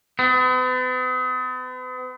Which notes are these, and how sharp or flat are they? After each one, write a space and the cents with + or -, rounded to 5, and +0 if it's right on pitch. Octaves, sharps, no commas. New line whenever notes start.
B3 +45